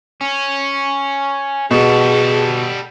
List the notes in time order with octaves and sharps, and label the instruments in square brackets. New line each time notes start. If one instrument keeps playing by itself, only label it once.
[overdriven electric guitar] C#4
[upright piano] B2 [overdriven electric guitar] G3 A4 [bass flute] G#4